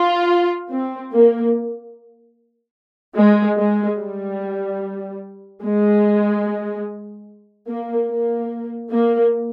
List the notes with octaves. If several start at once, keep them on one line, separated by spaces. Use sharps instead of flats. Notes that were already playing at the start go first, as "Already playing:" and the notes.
Already playing: F4
C4
A#3
G#3
G#3
G3
G#3
A#3
A#3
A#3